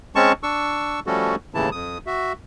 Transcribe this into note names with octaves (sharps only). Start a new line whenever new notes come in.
G#3 C4 C#4 A5 C#6
D4 C#6 E6
F3 G3 A3 C#4 F#4 A4
D#2 A2 C#3 E3 E4 A5
F2 D#6
F#4 E5